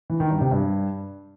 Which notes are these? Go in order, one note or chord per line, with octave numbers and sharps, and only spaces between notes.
E3
D#3
G2
C3
G2